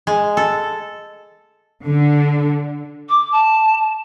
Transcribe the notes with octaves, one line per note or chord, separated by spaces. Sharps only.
G#3
A4
D3
D6
A5